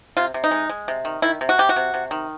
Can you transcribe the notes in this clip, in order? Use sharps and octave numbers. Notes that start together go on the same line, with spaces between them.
C3 F4
C3
D#4
G#3
G#3
C3
D#3
D#3 E4
C3
F#4
C3 G4
F#4
C3
C3
D#3